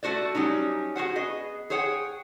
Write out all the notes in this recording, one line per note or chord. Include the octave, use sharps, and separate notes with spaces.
A3 F#4 C5 D5
F#3 G3 C#4 D#4
F#4 G#4 C5 F#5
B3 G#4 D#5
G#4 C5 C#5 F#5 G5